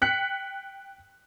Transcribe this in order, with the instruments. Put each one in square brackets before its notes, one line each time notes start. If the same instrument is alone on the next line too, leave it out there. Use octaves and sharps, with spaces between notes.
[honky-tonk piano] G5 F#6 B6 C#7